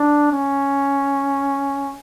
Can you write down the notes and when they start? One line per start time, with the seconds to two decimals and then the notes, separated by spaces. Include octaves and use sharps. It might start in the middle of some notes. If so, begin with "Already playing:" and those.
Already playing: D4
0.32 C#4